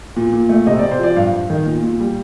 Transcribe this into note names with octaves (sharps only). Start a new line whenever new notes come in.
A#2
A#2
A3
C3 D#5
C3 D5
C5
F3 D5
G2 F5
G2
D#3
A#2
A#2
G3